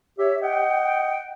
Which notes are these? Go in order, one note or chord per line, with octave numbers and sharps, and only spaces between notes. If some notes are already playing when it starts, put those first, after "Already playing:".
G4 C#5 E5
D#5 F#5 G5